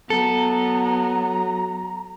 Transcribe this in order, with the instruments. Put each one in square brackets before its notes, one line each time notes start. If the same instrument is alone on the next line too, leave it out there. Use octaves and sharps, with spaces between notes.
[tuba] F#3 [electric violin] B3 [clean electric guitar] A4 [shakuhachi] A#5